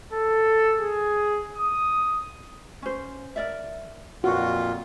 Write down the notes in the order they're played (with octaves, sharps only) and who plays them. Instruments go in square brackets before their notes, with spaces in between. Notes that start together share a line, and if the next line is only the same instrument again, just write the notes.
[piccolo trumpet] A4
G#4
D#6
[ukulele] C#4 C5
A#4 D5 E5
[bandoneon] F2 A#2 F4 [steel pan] F#4